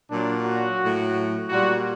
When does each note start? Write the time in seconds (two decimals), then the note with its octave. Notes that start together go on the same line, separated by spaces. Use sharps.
0.10 A#2 F#3 D4
0.45 F#4
0.80 A2 F#3
1.48 A#2 G3 F#4